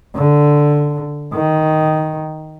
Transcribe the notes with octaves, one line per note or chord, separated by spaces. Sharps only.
D3
D#3